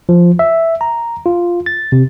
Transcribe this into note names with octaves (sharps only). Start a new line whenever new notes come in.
F3
E5
A#5
F4
A6
C3